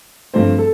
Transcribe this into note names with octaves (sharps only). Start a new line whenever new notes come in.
G2 F3 A3 C4 C5
A4